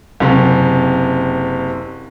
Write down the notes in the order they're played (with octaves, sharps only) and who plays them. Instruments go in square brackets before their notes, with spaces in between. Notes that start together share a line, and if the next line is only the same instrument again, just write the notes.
[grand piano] F#1 C3